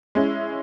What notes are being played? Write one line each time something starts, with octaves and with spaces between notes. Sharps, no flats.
G#3 C#4 E4